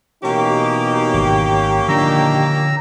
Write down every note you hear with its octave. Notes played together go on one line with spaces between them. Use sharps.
B2 E3 A#3 C#4 D#4 G4
G#1
A#2 D3 D#3 F3 D4 A#5 E6